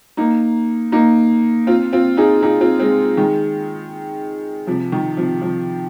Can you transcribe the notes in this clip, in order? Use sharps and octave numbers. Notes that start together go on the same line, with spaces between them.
A#3 D#4
A#3 D#4
C4 F4
C4 F4
D#4 G#4
D#4 G#4
C4 F4
G#3 C4
D#3 G#3
C3 F3
D#3
C3 F3
C3 F3